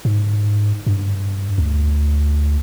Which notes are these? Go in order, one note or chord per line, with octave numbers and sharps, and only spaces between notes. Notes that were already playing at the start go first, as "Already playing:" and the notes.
G#2
G2
D2